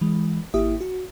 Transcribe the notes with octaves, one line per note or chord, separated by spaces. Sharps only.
E3 G#3
G#1 A#3 E4 G4 E5 D#6
F#4